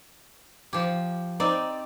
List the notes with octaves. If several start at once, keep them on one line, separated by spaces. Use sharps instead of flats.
F3 G4
C4 D#4 D5